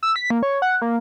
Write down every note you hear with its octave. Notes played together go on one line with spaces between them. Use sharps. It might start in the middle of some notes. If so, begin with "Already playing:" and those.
E6
B6
A#3
C#5
F#5
A#3